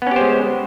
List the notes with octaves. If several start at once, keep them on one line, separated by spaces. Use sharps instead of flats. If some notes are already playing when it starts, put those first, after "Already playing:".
G#3 B3 C#4 G4 C5